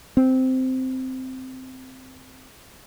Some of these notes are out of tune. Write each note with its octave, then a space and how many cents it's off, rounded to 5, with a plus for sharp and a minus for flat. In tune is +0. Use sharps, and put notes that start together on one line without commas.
C4 -10